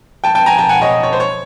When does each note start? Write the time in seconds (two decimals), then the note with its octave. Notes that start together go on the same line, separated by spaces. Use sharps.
0.24 G5 A5
0.35 G5 A5
0.46 G#5 A#5
0.58 G5 A5
0.69 F#5 G#5
0.82 C#5 D#5
1.03 C#5
1.12 C5
1.20 C#5